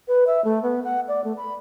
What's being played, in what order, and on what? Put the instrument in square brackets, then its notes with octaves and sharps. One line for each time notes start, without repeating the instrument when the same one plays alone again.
[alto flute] B4
E5
A3
B3
F#5
D5
A3
B5